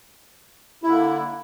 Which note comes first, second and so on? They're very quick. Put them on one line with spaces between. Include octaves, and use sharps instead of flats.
E4 D3 A#3